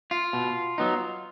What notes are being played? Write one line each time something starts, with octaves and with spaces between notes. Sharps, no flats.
F4
B2
F#3 B3 D#4